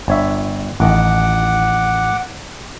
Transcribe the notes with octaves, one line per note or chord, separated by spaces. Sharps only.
G1 C#5 E5
A1 D#3 F#5 D6